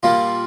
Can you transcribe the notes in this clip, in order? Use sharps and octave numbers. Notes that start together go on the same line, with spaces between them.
A#2 G3 A#3 F4